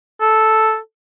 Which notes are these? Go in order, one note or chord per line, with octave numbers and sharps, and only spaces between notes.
A4